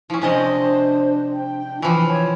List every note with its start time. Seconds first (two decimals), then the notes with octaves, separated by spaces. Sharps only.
0.10 F3 C#4 E4
0.22 C3 G#3 D4 C5 D#5
1.33 G5
1.63 D4
1.82 E3 F3 F4
2.06 C#5